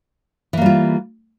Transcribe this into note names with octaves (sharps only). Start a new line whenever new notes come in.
E3 G3 A#3 F4